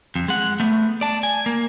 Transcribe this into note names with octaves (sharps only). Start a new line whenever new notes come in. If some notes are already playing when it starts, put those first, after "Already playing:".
F2
G#3 F#5
A3 B3
D5 A5
G#5
A#3